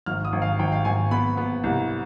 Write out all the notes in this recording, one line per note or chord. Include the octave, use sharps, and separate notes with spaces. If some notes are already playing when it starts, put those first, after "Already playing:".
G#1 F6
D#6
G#1
F5
G#1 G5
F5
G#1 G#5
B3 B5
B3
C2